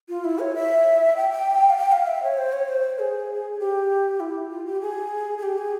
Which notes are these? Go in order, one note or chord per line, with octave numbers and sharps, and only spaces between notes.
F4
E4
C#5
E5
G5
G5
F5
G5
F5
E5
C#5
C5
C#5
C5
G#4
G4
E4
F4
G4
G#4
G#4
G4
G#4